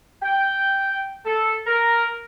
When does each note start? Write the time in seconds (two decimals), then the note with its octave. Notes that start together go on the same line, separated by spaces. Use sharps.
0.23 G5
1.24 A4
1.67 A#4